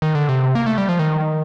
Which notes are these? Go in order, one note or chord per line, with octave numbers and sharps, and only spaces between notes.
D#3
D3
C3
A#3
A3
G3
F3
D#3